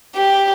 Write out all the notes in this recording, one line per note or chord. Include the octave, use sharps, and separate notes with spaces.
G4